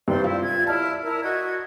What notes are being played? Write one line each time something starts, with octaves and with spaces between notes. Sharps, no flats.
G2 C3 G3 C5 D5 C6
E4 F4
D5 G#6
E4 D5 A5 F6
E4 A#4
F#4 D#5 G#6